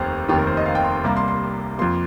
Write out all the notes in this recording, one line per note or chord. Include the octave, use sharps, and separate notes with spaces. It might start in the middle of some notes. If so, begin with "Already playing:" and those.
Already playing: F1 D#2 D#3 A#3 G4 C5
F1 D#2 D#3 G4
A#4
C5
D#5
F5
G5
C6
C2 C3 G3 A#3 A#5
C6
C6
F2 F3 A#3 C6